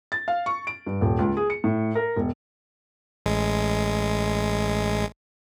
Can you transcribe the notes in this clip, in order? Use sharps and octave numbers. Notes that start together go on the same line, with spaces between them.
A6
F5
C#6
D7
G2
D#1
C#2
G#4
C#7
A2
A#4
E1
A1 G#3